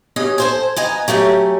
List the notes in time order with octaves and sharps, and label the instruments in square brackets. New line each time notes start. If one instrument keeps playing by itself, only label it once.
[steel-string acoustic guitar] G2 B2 C#4 D#5
A4 C5 G#5
B3 D#5 G#5 A#5
F#3 A3 C#4 G4